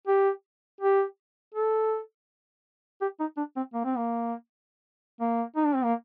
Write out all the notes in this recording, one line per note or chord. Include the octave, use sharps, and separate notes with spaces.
G4
G4
A4
G4
D#4
D4
C4
A#3
C4
A#3
A#3
D#4
D4
C4
A#3